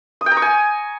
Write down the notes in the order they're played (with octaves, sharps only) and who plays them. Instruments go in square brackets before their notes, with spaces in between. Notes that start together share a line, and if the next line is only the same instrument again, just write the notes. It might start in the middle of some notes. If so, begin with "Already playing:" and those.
[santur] D#6
G5
A#5
C#6
G#5